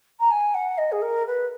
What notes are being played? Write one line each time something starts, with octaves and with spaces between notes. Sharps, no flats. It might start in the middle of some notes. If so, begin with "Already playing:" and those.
A#5
G#5
F#5
D#5
G#4
A#4
B4